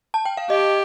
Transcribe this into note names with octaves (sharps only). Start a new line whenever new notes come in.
A5
G5
F5
G4 D#5